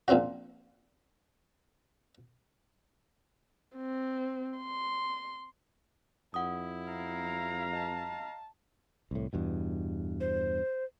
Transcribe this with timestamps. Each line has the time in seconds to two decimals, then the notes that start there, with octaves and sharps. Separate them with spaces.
0.08 A#1 A#2 C4 C#4 F#4
3.76 C4
4.58 C6
6.34 F2 E4 F#5 D#6
6.91 F5 A#5
7.73 D#5 A5
9.11 C2 A2
9.33 E2 G2 B2
10.20 C5